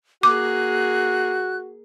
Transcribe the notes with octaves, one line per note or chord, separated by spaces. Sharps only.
A#3 F#4 G#4 D6 F#6